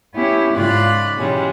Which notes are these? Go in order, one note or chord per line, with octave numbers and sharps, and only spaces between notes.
B3 C#4 E4 G4
G#2 C#3 F4 D5 B5 F#6
B2 E3 G3 G#3 C#4